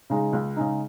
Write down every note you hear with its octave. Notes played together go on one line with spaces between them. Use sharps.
C#3 G#3 D#4
C#2
C#3 G#3 D#4